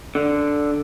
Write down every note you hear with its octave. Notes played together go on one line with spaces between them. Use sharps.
D3